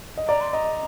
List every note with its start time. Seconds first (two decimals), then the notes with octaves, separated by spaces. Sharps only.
0.17 D#5
0.28 D5 A#5
0.41 C6
0.53 D#5 A#5